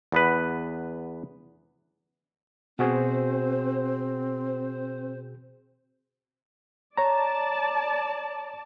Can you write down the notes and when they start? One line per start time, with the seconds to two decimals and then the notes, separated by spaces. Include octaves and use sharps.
0.12 E2 B3 B4
2.79 B2 C4 F#4 G#4 C5
4.47 C5
6.97 C#5 D5 A5 A#5